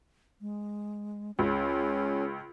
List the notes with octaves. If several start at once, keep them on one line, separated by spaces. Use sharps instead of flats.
G#3
C#2 C#4 G#4